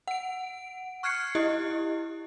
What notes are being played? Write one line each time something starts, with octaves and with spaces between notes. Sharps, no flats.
F#5 D7
C#6 F6 F#6 G#6 C7 C#7
E4 G4 D#5